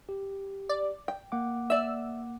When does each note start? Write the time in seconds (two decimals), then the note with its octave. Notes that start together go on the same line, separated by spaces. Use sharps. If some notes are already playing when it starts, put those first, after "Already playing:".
0.09 G4
0.69 D5
1.08 G5
1.32 A#3 F#5 D6
1.70 D5 E5 E6